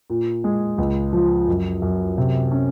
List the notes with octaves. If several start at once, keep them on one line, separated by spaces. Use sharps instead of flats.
A#2
G#3
C#2
F3
F#2
F#2
C3
C#4